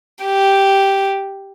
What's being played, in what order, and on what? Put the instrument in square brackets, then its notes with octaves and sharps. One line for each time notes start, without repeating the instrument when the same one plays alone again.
[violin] G4